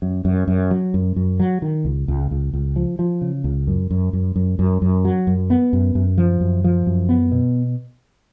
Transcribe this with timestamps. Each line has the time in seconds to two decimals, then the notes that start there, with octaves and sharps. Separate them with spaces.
0.02 F#2
0.25 F#2
0.48 F#2
0.71 F#3
0.94 F#2
1.16 F#2
1.40 F#3
1.62 D#3
1.85 C#2
2.08 C#2
2.31 C#2
2.53 C#2
2.76 F3
2.99 F3
3.21 C#3
3.44 C#2
3.67 F#2
3.91 F#2
4.13 F#2
4.36 F#2
4.59 F#2
4.82 F#2
5.05 F#3
5.27 F#2
5.50 B3
5.73 F#2
5.95 F#2
6.18 F3
6.41 F#2
6.64 F3
6.87 F#2
7.09 B3
7.32 B2